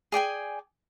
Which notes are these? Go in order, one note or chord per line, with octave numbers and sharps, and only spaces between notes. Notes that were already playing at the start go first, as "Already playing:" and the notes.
G#4 D5 G5 G#5